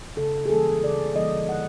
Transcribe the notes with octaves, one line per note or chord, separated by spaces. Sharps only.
C#3 A4
G#4
E3 G3 A#3 A4
C#3 D5
E3 G3 A#3 D#5
D3 F#5